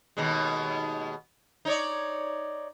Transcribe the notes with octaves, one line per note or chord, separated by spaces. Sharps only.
D#2 B2 G#3
D#4 C#5 D5